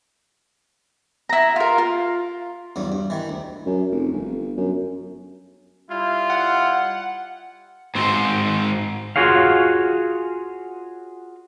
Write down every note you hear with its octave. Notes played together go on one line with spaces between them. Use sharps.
E4 A#5
F4 A#4
F4
E2 G2 F#3
G2
D#3 E3
D2
F#2
F1
G1
F#2
G3 E4 F4
F#5
G#2 C4
F4 F#4 G#4 C#5 F5